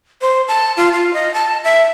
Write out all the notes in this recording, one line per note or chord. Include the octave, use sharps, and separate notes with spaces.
C5
A5
F4
F4
D#5
A5
E5